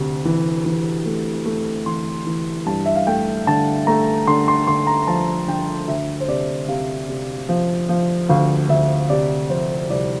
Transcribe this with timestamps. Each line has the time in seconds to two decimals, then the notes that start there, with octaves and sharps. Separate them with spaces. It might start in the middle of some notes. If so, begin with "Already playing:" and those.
Already playing: D2 C3
0.25 E3
0.66 E3
1.06 A3
1.45 A3
1.86 E3 C6
2.26 E3
2.66 G2 A5
2.86 E5
2.95 F5
3.07 A3 G5
3.47 D3 A5
3.87 A3 A#5
4.27 D3 C6
4.48 C6
4.67 D3 C6
4.87 A#5
5.07 F3 A5
5.48 D3 G5
5.88 D2 E5
6.20 C5
6.28 C3 D5
6.68 C3 F5
7.09 C3
7.49 F3
7.89 F3
8.29 D2 F5
8.69 D2 E5
9.10 C3 D5
9.50 F3 C5
9.90 C2 D5